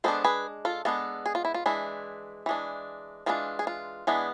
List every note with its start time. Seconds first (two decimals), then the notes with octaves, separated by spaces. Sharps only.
0.04 G#3 B3 D4 A4 C5
0.24 G#4 B4
0.65 F4 A4
0.85 G#3 B3 D4 F4 A4
1.26 G#4
1.35 F4
1.45 E4
1.54 F4
1.66 E3 G#3 D4 E4
2.46 E3 G#3 D4
3.26 E3 G#3 B3 D4 F4
3.59 G#4
3.67 F4
4.07 E3 G#3 B3 D4